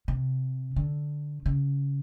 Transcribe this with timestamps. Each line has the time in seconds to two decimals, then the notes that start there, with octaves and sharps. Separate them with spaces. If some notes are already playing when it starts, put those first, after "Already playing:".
0.08 C3
0.76 D3
1.46 C#3